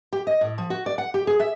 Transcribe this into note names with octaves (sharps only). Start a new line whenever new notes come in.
G4
D#5
A2
F3
F#4
D5
F#5
G4
G#4
E5